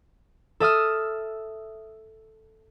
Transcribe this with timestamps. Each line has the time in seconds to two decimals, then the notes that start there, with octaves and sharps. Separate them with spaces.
0.60 A4 E5 D#6 F6